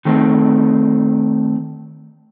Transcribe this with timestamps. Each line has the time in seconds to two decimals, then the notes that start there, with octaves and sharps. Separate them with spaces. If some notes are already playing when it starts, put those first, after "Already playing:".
0.05 D#3 A3 C4